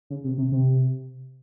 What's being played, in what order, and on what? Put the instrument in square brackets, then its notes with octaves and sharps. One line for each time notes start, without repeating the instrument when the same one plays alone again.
[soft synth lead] C#3
C3
C3
C3